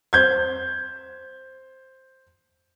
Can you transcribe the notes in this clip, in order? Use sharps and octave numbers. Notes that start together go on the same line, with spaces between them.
C5 G6 G#6